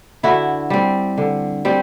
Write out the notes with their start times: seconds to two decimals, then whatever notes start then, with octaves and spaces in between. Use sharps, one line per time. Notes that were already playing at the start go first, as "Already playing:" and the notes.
0.23 D3 E4 F#4
0.70 G3 C4
1.18 D3
1.65 G3 C4